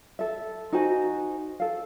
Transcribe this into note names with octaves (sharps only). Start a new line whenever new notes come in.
A4 E5
D#4 F#4 C5 G#5
A4 F5